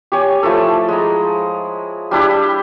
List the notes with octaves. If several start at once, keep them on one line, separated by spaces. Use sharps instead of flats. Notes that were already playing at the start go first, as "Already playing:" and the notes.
G4 C#5 G#5
F3 A3 E4 A4
G#3 A#5
G3 D4 E4 G4